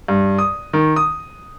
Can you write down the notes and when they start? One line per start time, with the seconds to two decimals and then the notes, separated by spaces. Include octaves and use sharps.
0.08 G2
0.39 D#6
0.73 D#3
0.96 D#6